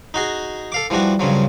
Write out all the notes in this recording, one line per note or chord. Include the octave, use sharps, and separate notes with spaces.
D#4 F#4 G#4
A4 F5 D6
E3 F3 G3 D4 F#4
G2 C#3 F3 F#3